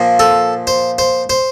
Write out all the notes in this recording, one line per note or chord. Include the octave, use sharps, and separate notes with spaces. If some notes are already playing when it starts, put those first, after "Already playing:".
Already playing: A#2 F3 A#3
A4
C5
C5
C5